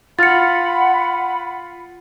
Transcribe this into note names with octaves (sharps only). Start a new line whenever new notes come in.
F4 F#5 B5 F6 A6 C#7